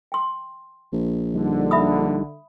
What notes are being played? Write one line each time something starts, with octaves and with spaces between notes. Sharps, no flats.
G5 C6
A#1
D3 G3 D#4
E5 B5 D#6